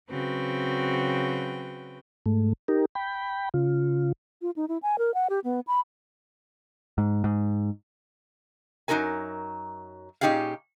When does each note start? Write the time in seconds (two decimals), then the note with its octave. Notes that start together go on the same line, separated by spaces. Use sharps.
0.11 C#3 F#3 C4 F#4 B4 G5
2.26 G#2 A3
2.68 D#4 G4 A#4
2.95 G5 B5
3.54 C#3 F4
4.42 F4
4.56 D#4
4.69 E4
4.83 G#5
4.98 A#4
5.14 F#5
5.30 G4
5.44 B3
5.67 B5
6.98 G#2
7.24 G#2
8.88 F#2 F#3 D#4 F#4 A#4 G#5
10.21 A#2 C#4 D#4 G4 G#4 F5